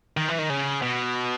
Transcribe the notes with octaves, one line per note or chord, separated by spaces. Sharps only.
D#3
E3
D#3
C#3
B2